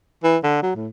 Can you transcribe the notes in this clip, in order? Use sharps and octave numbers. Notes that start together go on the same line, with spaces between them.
E3
D3
F#3
A2